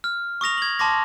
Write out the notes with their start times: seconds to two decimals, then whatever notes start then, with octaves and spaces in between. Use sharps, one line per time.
0.04 F6
0.41 C#6 D#6 A#6 F7
0.58 G#6 F#7
0.79 A5 C6 D6 A#6